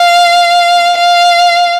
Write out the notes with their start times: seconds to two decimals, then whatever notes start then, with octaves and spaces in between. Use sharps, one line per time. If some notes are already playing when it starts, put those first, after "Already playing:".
Already playing: F5
0.98 F5